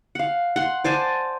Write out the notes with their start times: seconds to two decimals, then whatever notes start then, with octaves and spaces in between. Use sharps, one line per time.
0.15 F5 F#5
0.56 F#5 C6
0.84 C5 D5 G#5 A5